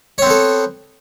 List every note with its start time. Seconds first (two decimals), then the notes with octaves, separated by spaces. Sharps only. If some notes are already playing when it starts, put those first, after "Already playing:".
0.18 C#5
0.22 C4
0.26 B3
0.30 A4